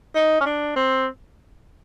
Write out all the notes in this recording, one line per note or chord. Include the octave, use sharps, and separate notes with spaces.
D#4
C#4
D4
C4